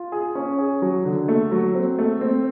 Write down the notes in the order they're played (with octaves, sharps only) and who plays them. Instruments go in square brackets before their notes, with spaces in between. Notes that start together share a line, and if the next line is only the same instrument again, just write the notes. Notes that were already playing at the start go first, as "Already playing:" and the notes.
Already playing: [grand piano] F4
G#4
C#4
G#4
F#3
D3
A3
F#3
C4
A3
C4